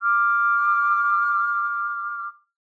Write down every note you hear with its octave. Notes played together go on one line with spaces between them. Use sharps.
D6 F6